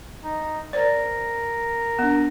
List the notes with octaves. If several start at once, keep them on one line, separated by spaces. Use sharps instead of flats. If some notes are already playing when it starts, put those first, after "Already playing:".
D#4
A#4 C5 D5
B3 D4